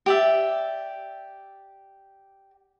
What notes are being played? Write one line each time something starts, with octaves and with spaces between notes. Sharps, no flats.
G4 D5 E5